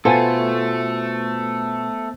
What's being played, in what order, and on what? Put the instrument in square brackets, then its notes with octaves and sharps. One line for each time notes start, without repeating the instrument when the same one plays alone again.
[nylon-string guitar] B2 F4 G#5 [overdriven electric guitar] A3 [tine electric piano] B3 C5 [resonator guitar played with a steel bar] A4